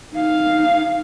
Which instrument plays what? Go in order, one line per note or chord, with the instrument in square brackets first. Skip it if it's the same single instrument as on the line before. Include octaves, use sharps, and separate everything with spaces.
[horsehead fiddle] D#4 F5